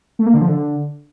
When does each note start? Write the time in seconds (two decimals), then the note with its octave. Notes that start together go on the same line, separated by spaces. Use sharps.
0.19 A3
0.26 A#3
0.34 D3
0.41 F3
0.49 D3